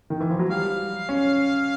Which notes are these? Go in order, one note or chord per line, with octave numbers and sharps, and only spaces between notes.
D#3
E3
F3
F#3
G3 F5
C#4